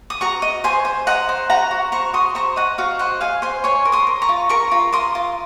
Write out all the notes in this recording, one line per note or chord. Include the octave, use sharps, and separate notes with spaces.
D#6
F#4 A#5 C#6
D#5
C5 G#5 C6
C5
D#5 F#5 A#5
C5
F#4 F#5 A#5
F#4
C5 A#5 C#6
F#4 C6 D#6
C5 A#5 C#6
D#5 F#5 A#5
F#4 F5
C5 D#5 F#5
D#5 F5 G#5
C5 G#5 C6
C#5 G#5 C6
A#4
C6 D#6
A#4
A#5 C#6
F4
A#4 A#5 C#6
F4
A#4 C6 D#6
F4